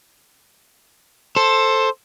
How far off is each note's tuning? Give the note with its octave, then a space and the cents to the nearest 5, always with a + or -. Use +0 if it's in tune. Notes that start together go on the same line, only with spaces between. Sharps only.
A4 +5 C5 +15